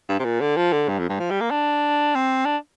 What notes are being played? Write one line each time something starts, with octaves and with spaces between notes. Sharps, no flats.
G2
C3
A#2
D3
F3
D3
G2
F2
G2
F3
G3
A#3
D4
C4
D4